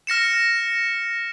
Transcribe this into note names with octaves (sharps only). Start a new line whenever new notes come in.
F6 A#6 C#7 E7